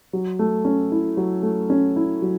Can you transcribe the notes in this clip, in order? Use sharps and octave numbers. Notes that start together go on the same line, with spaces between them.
F#3
A3
C#4
E4
F#3
A3
C#4
E4
F#3